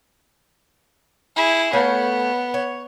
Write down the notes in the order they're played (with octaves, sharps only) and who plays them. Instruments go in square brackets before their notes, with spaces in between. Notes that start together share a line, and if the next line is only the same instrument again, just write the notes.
[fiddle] E4 G#4
[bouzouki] A3 C#5 F5 [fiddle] B3
[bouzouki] C#5